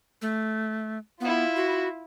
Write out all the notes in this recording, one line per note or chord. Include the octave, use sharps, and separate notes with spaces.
A3
B3 E4 F4
F#4